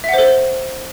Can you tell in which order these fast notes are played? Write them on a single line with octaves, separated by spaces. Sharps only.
E5 F#5 C5 A4